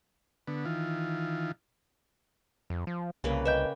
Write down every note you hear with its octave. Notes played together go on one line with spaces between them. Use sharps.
D3 B3
D#3 E3 F4
F2
F3
C2 C#3 A#3 B4
B4 D#5 E5 G5 G6